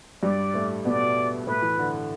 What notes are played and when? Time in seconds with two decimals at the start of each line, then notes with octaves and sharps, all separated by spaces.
0.23 G2 G3 D5
0.54 A2 A3
0.85 B2 B3 D5
1.47 A2 A3 B4
1.62 E3
1.79 D3